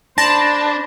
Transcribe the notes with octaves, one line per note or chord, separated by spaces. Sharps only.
D4 C5 A5 B5 A#6